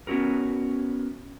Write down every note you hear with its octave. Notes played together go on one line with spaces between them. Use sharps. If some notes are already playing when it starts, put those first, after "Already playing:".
B3 C#4 E4 F#4 A#4